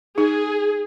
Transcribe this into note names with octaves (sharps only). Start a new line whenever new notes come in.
D#4 G#4